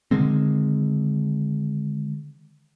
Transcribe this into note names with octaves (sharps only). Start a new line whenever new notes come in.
D3 D#3 G#3 C4